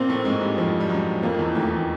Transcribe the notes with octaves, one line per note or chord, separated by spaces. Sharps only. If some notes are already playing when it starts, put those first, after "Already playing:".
Already playing: A#2 A#3 C4
A2 A3
G#2 G#3
G2 G3
F2 F3
G3
F#2 F#3
F2 F3 A#3
D#3
E2 E3
D#2 D#3 A3
E3